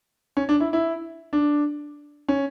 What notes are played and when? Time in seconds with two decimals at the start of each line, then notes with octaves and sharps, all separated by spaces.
0.37 C#4
0.49 D4
0.60 E4
0.73 E4
1.33 D4
2.28 C#4